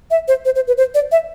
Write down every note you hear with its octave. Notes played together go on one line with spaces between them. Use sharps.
E5
C5
C5
C5
B4
C5
D5
E5